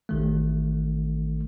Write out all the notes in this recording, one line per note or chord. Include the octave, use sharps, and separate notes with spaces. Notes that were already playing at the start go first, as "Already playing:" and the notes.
A1 D#3 A3